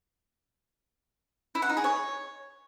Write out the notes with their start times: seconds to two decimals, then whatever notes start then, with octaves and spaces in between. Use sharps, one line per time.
1.55 E4
1.62 F#5
1.70 D#4
1.77 G#4
1.84 C#5